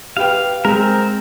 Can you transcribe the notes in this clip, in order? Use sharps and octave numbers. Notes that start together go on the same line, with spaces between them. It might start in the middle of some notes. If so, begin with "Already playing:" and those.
G4 B4 F5 G5
G#3 C4 A#4